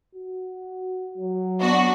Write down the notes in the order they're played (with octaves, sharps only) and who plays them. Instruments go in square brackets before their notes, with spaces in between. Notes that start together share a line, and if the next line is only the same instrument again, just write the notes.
[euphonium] F#4
F#3
[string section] B3 D4 F#4